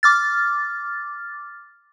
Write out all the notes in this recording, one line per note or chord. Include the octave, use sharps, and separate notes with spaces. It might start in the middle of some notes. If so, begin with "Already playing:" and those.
D6 F6 A6